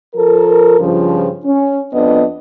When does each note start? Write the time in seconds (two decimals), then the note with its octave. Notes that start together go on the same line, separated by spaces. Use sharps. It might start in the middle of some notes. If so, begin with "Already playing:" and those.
0.15 F3 A4 A#4
0.79 G2 C#3 F3
1.44 C#4
1.93 F2 B3 D4 D#5